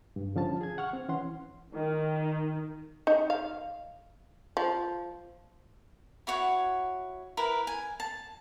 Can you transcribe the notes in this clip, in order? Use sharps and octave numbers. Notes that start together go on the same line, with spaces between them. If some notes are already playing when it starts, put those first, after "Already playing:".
G2
D3 F3 C#4 A5
G#4 G#6
F#5 C#6 F6
C4
E3 C#4 F#5 C6
D#3
D#4
F5
F3
E4 F#4 C#5 F#5
E4 A#4 B4
G#5
A5